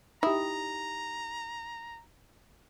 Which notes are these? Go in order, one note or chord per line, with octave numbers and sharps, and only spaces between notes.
D#4 E4 G4 E5 A#5 D#6